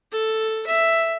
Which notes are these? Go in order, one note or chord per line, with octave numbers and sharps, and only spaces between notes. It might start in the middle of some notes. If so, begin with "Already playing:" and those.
A4
E5